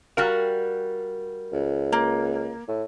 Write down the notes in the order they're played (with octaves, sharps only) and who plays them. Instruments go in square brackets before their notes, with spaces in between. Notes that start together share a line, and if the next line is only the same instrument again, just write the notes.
[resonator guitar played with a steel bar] G3 F#4 F5 [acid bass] A#4
[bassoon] C#2
[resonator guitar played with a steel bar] A#3
[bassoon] A2